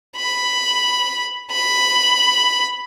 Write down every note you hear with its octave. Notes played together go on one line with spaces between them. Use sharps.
B5
B5